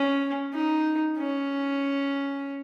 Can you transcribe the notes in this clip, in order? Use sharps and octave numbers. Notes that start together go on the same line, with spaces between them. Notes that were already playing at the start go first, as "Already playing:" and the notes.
Already playing: C#4
D#4
C#4